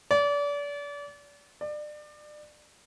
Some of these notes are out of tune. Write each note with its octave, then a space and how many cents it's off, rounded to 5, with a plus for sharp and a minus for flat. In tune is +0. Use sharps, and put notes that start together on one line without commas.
D5 -35
D5 +30